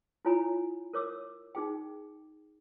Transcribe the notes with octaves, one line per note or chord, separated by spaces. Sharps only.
E4 F4 C#5 G#5 A#5 B5
A#4 C#5 D6 E6
D#4 G#4 G5